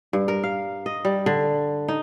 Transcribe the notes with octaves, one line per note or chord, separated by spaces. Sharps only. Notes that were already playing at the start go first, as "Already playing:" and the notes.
G2
A#4
F5
D#5
G3
D3
D#4